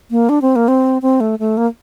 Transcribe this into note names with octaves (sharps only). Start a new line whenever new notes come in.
A#3
D4
C4
A#3
C4
C4
A3
A3
A#3